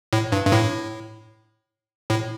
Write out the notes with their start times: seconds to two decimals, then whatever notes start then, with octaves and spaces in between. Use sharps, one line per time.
0.13 A2
0.32 G2
0.46 G2
0.52 A2
2.10 A2